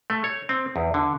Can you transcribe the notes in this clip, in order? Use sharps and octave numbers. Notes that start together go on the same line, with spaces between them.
A3
C#5
C4
E2
D3